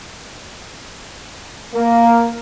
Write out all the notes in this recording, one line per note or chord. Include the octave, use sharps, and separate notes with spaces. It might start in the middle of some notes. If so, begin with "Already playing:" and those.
A#3